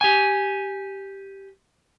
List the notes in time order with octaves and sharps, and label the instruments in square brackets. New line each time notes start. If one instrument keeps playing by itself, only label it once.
[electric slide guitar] G4 G#5